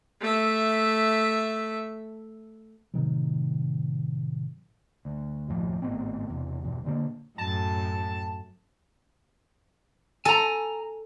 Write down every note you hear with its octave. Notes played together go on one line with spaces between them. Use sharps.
A3 E5
A2 C3 D#3 F#3
D2
F#1 D#2 A2 F3
G#1 A2 B3 C4
E1 E2 C3
E1 B1 G2 E3
A#2 D3 A#3
F#2 A2 A5
A4 G#5 A#5